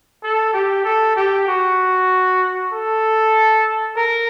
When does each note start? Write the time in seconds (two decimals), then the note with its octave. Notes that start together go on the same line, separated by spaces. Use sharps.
0.23 A4
0.54 G4
0.85 A4
1.16 G4
1.47 F#4
2.73 A4
3.97 A#4